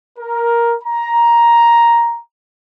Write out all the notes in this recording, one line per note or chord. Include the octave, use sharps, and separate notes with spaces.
A#4
A#5